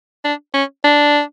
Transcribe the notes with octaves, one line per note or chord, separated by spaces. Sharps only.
D4
C#4
D4